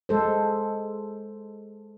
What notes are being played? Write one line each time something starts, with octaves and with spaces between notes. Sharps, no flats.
G#3 A4 C5